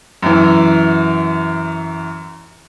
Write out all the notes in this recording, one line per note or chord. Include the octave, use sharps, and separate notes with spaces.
F#2 E3